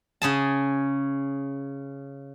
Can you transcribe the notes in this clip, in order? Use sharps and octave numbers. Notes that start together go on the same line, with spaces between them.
C#3 G#4 A5